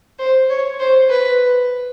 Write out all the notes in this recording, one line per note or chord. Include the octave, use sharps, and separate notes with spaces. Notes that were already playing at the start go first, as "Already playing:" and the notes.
C5
C#5
C5
B4